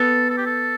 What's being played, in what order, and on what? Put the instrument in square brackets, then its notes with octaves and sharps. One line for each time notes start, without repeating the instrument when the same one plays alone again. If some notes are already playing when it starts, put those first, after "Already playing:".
Already playing: [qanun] B3 [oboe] A4
[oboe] A4
G4
A4